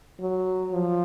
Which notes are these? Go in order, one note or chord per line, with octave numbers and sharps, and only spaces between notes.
F#3
F3